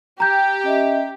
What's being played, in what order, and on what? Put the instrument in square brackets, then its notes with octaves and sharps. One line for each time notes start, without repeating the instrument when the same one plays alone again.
[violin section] G4 [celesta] A#5 G6
[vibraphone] C#4 D#5 E5